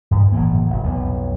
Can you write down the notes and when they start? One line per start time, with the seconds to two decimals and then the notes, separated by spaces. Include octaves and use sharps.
0.11 G2
0.32 F#1 A2 E3 A#3
0.70 F1
0.84 B1 F2